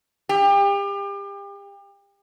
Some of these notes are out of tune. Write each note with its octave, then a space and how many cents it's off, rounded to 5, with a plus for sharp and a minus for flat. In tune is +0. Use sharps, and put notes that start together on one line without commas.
G4 +35